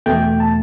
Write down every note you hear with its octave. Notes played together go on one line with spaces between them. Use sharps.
E2 B2 A3 G5
A5